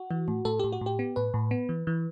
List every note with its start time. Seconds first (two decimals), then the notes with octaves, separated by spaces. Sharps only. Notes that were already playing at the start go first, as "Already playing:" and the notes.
Already playing: F#4
0.11 E3
0.28 A2
0.45 A2 A4
0.60 A2 G4
0.72 F#4
0.81 A2 G4
0.99 B3
1.16 A2 B4
1.34 A2
1.51 B3
1.69 E3
1.87 E3